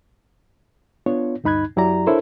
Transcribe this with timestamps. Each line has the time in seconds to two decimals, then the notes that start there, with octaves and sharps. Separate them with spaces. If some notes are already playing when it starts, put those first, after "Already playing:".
1.06 B3 D4 F4 C#5
1.44 D2 G2 D#4 B5 F#6 G#6
1.76 F#2 F#3 E4 G4 D5 A#5
2.07 D4 E4 A4 A#4 C5 C#5